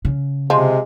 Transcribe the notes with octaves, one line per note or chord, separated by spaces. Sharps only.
C#3
C3 F3 G#3